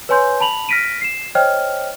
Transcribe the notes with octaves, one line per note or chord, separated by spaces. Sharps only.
B4 C#5 G#5 C6 G6
A5 B5 F7 F#7
F6 A#6 B6 D7 D#7
C7 E7
C5 C#5 D#5 G5 F6